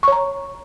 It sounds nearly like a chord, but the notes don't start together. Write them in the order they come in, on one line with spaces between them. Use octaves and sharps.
C#6 C#5 A#5